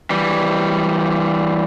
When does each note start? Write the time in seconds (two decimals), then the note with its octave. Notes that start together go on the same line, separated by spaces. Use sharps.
0.10 E3 G3